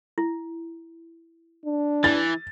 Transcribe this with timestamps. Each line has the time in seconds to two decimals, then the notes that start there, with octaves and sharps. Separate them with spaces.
0.18 E4
1.66 D4
2.04 E3 A6